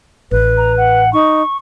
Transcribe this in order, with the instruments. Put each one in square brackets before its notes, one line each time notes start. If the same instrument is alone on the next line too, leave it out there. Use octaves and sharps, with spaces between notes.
[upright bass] A1 [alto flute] B4
[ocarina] A#5
F#5
[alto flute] D#4 [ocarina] C#6